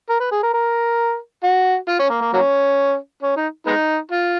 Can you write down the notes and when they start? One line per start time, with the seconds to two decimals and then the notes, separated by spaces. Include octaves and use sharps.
0.09 A#4
0.20 B4
0.32 G#4
0.43 A#4
0.53 A#4
1.43 F#4
1.88 F4
1.99 C#4
2.10 A#3
2.21 A#3
2.33 F#3 A#3 C#4
3.22 C#4
3.37 D#4
3.66 G#3 B3 D#4
4.11 F4